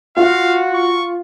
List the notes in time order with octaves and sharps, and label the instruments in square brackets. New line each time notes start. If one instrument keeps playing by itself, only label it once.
[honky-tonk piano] F4 [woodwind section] F#4 [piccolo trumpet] F5
[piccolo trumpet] C#6